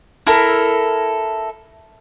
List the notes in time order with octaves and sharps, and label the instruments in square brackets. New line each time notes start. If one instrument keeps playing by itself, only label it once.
[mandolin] E4 A4 A#4